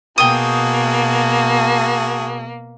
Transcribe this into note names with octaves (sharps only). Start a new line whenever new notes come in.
B2 A#3 F#4 G#4 G5 A5 D#6